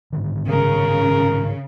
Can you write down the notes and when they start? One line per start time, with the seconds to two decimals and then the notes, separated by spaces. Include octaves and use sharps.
0.13 G#2 D3 D#3
0.48 C#3 A#4